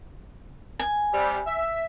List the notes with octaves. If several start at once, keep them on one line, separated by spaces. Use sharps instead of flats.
G#5
C3 G3
E5